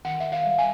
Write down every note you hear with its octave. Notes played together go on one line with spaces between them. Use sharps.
D#3 F#5
D#3 E5
F5
G3
G#5